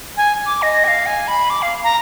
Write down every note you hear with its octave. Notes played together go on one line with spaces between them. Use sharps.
G#5
D6
D#5
G#5
F5
G#5
B5
D6
F5
A#5